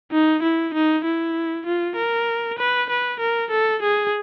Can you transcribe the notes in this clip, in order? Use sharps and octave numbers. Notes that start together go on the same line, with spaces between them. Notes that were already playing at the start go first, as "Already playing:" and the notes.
D#4
E4
D#4
E4
F4
A#4
B4
B4
A#4
A4
G#4